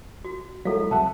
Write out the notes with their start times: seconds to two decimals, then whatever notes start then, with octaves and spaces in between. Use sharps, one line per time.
0.25 F#4
0.65 F#3 G#3 E4 A4 F5
0.91 C2 E5 F#5 A5